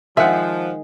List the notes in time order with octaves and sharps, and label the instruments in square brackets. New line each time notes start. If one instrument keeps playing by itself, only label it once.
[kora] D#3 G#3 G#4 [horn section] F3 [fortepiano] E5 F#5